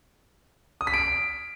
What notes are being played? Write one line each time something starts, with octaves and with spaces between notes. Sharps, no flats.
D#6
B6
D7